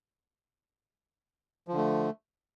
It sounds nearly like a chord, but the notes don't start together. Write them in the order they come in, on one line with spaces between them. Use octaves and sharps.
F3 D3 A3